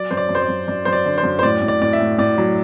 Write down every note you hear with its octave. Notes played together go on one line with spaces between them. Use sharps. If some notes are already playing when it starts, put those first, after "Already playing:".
Already playing: F#3 D5
F#2 C5
D5
F#2
C5
D5
F#2
F#2 D5
F#2 C5
D5
D3
C5
F#2
C5
A2 D5
A2
D5
A2 D5
E5
A2
A2 D5
F#3